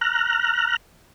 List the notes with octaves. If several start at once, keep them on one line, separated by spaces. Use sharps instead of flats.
A#5 F6 F#6